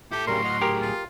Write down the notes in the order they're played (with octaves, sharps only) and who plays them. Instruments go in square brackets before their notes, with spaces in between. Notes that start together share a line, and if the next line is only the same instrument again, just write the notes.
[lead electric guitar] E4 A4 [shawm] G4
[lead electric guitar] A2 F#3 [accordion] C#3 G3 A#4 [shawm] C6
[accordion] D#5 F#5 F6
[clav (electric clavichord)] G4 A#4 [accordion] G#4
[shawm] F4